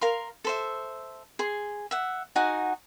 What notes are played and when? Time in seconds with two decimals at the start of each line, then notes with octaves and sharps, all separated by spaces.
0.01 A#4 F5 C6
0.44 A4 C5 E5
1.39 G#4 C6
1.91 E5 F#5
2.36 D#4 F#4 G#4 F#5